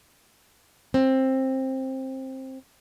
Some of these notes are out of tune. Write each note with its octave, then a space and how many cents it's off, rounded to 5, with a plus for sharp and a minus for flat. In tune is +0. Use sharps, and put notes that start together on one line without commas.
C4 +15